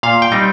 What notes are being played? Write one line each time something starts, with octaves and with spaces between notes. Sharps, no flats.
A#2 F5
G5
G3 C4 D#4